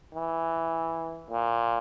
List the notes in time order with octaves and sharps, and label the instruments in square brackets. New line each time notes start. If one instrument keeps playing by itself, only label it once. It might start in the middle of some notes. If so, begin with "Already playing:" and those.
[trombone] E3
A#2